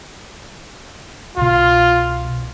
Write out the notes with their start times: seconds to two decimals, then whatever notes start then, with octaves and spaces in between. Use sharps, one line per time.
1.38 C2 B2 F4